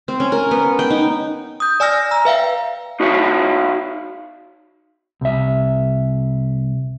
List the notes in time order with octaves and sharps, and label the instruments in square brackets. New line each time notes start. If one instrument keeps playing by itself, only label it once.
[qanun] C4
C#4
A#4
B3
G5
D#4
[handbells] D#6 G6
D5 G#5 E6 F6 A#6
A#5 E6
B4 E5 F5 G5
[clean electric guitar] D#4 F#4 C#5 E5 F5
C2 E5